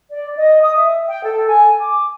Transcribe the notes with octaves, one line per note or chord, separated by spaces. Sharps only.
D5
D#5
D#6
E5
G5
A4
G#5
D6